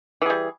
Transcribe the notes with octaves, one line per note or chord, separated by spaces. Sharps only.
E3 G3 G#4